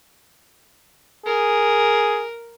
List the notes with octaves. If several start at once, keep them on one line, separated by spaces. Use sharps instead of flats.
G#4 A#4